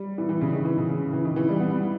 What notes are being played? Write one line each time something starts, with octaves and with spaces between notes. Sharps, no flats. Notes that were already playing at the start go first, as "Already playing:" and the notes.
Already playing: G3
E3
E3
C#3
D#3
E3
C#3
C#3
E3
D#3
E3
G3
B3
B3